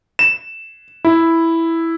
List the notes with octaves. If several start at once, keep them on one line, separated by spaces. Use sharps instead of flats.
E7
E4